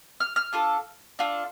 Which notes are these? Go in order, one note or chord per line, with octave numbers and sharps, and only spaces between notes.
F6
F6
D4 F4 A4
D4 F4 A4